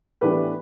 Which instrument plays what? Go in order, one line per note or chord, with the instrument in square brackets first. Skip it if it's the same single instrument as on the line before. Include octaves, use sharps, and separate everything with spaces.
[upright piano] A2 E3 B3 D4 G4 B4